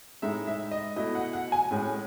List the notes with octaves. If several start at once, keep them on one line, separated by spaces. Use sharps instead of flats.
A2 G#3 D#4 E5
E5
D#5
B2 A3 E4 D#5
F#5
F#5
G#5
A2 G#3 C#4